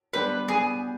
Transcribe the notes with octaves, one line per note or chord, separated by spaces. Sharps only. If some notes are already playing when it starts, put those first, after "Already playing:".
G3 B3 D4 G4 B4 C5
G3 B3 G#4